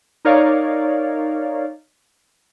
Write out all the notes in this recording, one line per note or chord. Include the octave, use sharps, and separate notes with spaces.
D#4 A#4 C#5 D5 F5